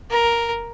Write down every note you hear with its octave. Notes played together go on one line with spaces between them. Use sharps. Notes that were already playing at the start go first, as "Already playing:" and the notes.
A#4